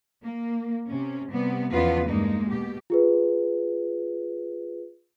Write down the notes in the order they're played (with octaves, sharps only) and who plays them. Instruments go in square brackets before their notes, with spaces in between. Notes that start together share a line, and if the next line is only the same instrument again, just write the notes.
[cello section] A#3
C3 C#4
C3 G3 B3
E2 C#3 F3 B3 F4 B4
G2 G#3 A#3 D#4
B2 G4
[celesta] F4 G#4 B4